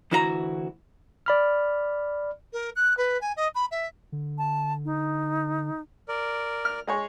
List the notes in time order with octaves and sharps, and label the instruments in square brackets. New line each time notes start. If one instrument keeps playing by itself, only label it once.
[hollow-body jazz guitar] D2 E3 E4 F#4 C5 A#5
[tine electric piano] D5 B5 F6
[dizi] A#4
F#6
B4
G#5
D#5
B5
E5
[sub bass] D3
[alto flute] A5
D#4
[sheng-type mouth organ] A#4 D5
[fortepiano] F6
G#3 G#4 C#5